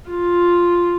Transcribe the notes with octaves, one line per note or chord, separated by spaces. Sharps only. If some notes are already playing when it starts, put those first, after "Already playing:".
F4